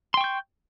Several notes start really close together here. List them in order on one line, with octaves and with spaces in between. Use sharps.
C6 G5 C#6 G6